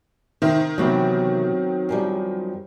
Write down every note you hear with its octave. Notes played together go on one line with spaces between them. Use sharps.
C3 D#3 C5 E5
C3 E3 F#3 B3 C4
F#2 F3 G3